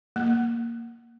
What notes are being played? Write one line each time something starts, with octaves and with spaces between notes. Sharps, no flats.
A#3